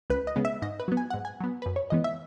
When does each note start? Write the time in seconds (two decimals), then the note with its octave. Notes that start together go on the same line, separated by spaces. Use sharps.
0.10 C#2 B4
0.27 D#5
0.36 C#3 G#3 B3
0.45 E5
0.62 G#2 D#5
0.80 B4
0.88 F#3 B3
0.97 G#5
1.10 G#2 F#5
1.25 G#5
1.40 F#3 B3
1.62 F#2 B4
1.76 C#5
1.90 E3 G#3 B3 D#5
2.04 E5